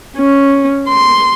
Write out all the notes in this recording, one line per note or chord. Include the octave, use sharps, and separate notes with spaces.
C#4
C6